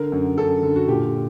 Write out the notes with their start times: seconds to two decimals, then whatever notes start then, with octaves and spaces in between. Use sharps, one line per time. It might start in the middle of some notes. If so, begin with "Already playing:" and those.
Already playing: D3 A#4
0.12 F#2
0.38 F#2 A4
0.62 D3
0.76 F#4
0.88 A#2 G4